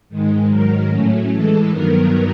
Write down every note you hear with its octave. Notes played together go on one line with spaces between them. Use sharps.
G#2 D#3 G#3
G#2 D#3 F#3 A#4
A2 F#3 A3 C#4
A2 E3 G#3 A4
G2 D#3 F#3 B3 A#4